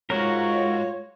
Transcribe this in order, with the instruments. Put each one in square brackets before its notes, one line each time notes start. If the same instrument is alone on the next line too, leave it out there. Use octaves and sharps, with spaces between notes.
[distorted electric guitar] B1 G#2 [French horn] F4 [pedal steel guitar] F#4 A#4 [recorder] C#5